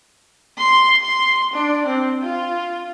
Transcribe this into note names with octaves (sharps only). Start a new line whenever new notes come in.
C6
C6
D4
C4
F4